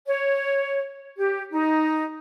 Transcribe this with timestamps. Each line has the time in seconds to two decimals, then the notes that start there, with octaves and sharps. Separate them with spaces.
0.06 C#5
1.17 G4
1.51 D#4